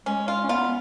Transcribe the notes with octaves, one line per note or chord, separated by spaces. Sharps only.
G#3 C#4
F4
C#4
B3 F4